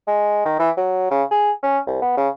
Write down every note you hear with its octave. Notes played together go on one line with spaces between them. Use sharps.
G#3
D#3
E3
F#3
C#3
G#4
C#4
C2
B3
C#3